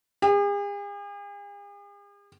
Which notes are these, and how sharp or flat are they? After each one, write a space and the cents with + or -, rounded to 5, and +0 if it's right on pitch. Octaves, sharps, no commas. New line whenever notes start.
G#4 -45